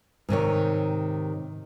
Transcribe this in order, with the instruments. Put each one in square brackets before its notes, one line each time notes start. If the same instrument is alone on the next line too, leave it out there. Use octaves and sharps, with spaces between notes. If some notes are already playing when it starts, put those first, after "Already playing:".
[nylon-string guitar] G#2 C3 D#3 C#5